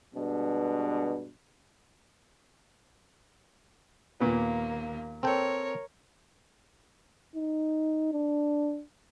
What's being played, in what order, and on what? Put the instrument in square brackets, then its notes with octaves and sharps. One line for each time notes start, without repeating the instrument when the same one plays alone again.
[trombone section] G2 B2 G#3 D4
[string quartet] D#2 A#3 [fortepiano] A#2 B3
[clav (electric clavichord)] C4 A4 G5 [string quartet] A#4 C#5
[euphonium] D#4
D4